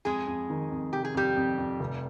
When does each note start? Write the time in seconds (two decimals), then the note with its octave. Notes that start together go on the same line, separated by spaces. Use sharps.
0.05 F2 G#3 G#4
0.27 F2
0.50 D#3
0.71 F2
0.93 C3 G4
1.05 G#4
1.14 F2 G3 G4
1.36 F2
1.58 F2
1.80 F1